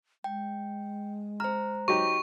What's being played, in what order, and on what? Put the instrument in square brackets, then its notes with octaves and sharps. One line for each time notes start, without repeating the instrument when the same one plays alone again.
[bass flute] G#3 [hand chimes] G5
[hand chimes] C5 A#5 [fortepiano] F6
[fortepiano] F#3 D#4 G4 [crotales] C#6